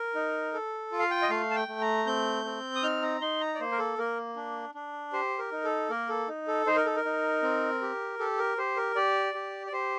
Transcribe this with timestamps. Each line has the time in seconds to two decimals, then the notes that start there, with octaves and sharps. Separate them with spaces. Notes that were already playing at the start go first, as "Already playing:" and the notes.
Already playing: A#4
0.15 D#4
0.53 A4
0.92 F4
0.99 F5
1.11 G5
1.22 D#5
1.30 A3 F5
1.51 A5
1.55 G5
1.68 A3
1.81 A#5
2.06 C4 G6
2.45 C4
2.76 D#6
2.83 D#4 F6
3.02 A#5
3.21 D#4 C6
3.41 A#5
3.55 D5
3.60 A#3 C5
3.72 A#4
3.79 A4
3.98 A#3 A#4
4.36 D4
4.75 D4
5.13 G4 C5
5.39 A#4
5.52 D#4
5.64 A4
5.89 A#3 A#4
6.09 A4
6.28 D#4
6.48 A4
6.66 D#4 C5
6.76 A#4
6.86 A4
6.96 A#4
7.05 D#4
7.43 C4
7.81 G4
8.19 G4 A4
8.38 A#4
8.58 G4 C5
8.77 A#4
8.96 G4 D5
9.34 G4
9.67 D5
9.72 G4 C5